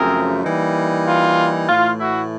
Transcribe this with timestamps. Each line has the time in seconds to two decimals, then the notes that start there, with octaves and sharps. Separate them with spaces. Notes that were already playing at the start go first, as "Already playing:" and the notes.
Already playing: F#2 C#3 F3 A3 C4 G#4 A#4
0.43 E3 G3 A#3 D#4
1.06 F4
1.69 A2 E3 A3 F4
2.00 E4 F#4